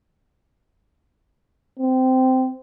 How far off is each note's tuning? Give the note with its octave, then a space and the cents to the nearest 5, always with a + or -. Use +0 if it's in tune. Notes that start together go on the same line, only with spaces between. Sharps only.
C4 -15